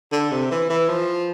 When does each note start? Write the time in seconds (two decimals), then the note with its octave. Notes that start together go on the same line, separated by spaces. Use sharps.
0.12 D3
0.32 C3
0.51 E3
0.70 E3
0.89 F3